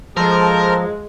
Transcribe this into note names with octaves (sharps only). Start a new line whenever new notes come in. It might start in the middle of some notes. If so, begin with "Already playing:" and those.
F3 G#3 A4 A#4 C5